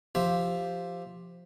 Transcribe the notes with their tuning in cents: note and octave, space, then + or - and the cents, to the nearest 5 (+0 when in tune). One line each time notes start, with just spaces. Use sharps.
F3 +0 G4 +0 E5 +0